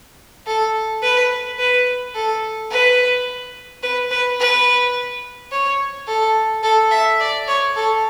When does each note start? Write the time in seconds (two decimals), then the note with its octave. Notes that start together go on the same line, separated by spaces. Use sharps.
0.47 A4
1.03 B4
1.59 B4
2.15 A4
2.71 B4
3.83 B4
4.11 B4
4.40 B4
5.52 C#5
6.07 A4
6.63 A4
6.91 E5
7.20 D5
7.48 C#5
7.76 A4